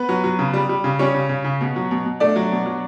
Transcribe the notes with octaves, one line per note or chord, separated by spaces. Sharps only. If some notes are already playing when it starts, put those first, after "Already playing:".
Already playing: B3 B4
F#3
F#3
C#3
G3
G3
C#3
G3 C#4 C#5
C#3
C#3
C#3
B2
F#3
B2
B2
A3 D4 D5
F#3
B2
F#3